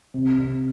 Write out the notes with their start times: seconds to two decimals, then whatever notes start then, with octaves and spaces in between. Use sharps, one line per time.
0.14 C3
0.38 C3